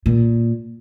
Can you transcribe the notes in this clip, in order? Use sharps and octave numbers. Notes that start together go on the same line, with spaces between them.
A#2